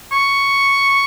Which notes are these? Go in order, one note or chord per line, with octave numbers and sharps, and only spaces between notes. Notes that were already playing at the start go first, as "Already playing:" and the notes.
C#6